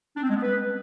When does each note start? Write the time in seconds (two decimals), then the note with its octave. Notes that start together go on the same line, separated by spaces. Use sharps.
0.17 D4
0.23 C4
0.30 G#3
0.36 B3
0.43 B4